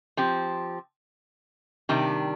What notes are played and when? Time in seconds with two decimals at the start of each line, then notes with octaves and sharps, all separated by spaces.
0.17 F3 C4 G4
1.89 C3 D#3 G3 D4